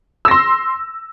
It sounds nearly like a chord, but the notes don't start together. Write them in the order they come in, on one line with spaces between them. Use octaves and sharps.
E6 A#6 C6